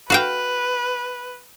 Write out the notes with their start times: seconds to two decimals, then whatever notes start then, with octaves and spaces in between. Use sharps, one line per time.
0.10 F#4 B4 F5 G5